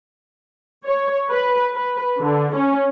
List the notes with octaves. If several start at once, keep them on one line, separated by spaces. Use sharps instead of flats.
C#5
B4
B4
D3
C#4